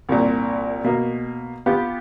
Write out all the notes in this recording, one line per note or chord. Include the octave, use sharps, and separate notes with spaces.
C2 A#2
B2 A#3
B3 F4 G4